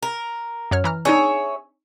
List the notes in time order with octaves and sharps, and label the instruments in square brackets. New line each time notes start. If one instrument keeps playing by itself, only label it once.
[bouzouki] A#4
[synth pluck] F#2 C#5 F6
E3 A#5 F6
[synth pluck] C4 D4 D#4 [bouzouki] G#4 C#5 E5